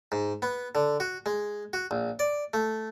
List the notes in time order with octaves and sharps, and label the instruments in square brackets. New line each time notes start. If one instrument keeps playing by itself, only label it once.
[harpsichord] G#2
B3
D3
F#4
G#3
F#4
A#1
D5
A3